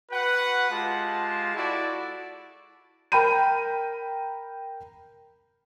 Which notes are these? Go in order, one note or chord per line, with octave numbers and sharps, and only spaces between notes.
F#4 B4 F#5
G#3 F4 G4 A5
E4 F#4 A4 D5
A#4 G5 A#5 B5 G6 D#7